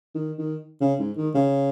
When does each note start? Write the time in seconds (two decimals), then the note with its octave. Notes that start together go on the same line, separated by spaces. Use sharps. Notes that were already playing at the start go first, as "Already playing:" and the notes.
0.15 D#3
0.38 D#3
0.81 C#3
0.99 G#2
1.17 D#3
1.35 C#3